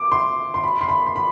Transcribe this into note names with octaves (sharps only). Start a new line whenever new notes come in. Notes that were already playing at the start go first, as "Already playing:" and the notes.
Already playing: D6
C6
C6
B5
C6
B5
C6
B5